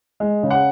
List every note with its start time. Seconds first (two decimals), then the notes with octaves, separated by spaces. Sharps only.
0.20 G#3
0.43 C#3
0.51 F#5